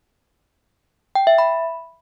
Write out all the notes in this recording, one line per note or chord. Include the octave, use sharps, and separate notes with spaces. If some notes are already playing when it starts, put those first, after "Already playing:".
G5
E5
B5